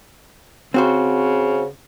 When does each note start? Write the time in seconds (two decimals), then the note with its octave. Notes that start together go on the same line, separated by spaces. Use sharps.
0.74 C#3 C4 F#4 C5